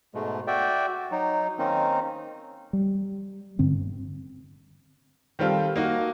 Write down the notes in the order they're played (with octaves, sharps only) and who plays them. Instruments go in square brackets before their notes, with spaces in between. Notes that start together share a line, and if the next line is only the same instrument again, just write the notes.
[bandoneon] G#2 B2 G#3 A3
F#4 D5 E5 G5
F#3 D#4
D#3 A#3 C4 C#4 D#4
[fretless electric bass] G3
G2 D3 C4
[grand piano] D#3 G3 C4 F4 A4
A#3 D#4 F#4